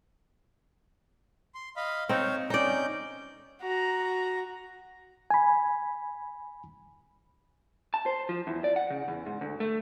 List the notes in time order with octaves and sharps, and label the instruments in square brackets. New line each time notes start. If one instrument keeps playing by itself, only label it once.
[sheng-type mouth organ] C6
D#5 F5 B5
[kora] C4 D#4 [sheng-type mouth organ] C#5 F5
[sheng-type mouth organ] C#4 G6 [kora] D#4 D5
[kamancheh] F#4 A#5
[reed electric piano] G#5 B5
[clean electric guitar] A5
C5
F3
E2
D5
F#5
C#3
E2
G#2
D2
A3